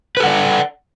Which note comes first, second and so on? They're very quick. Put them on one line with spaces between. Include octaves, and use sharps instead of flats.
B4 A4 F#5 D5